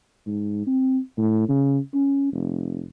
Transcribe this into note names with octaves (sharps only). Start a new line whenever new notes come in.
G#2
C4
A2
C#3
C#4
F1